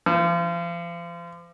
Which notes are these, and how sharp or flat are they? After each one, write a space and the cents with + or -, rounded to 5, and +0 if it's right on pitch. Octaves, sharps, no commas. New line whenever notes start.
F3 -35